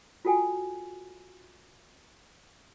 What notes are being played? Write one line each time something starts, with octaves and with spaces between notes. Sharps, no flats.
F4 F#4 A4 G5 G#5